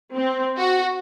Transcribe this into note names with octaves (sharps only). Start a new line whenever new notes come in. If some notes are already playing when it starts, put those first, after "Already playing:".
C4
F#4